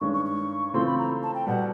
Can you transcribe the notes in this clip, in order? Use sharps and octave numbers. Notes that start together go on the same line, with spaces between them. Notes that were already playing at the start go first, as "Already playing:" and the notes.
G2 D#3 G#3 C#4 C#6
C#6
C#6
C#3 E3 A3 C4 F4 C6
B5
A#5
A5
G5
B2 G3 F#5